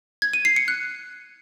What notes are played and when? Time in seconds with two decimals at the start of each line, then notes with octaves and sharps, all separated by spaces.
0.22 G#6
0.33 D#7
0.45 C7
0.56 C#7
0.68 F#6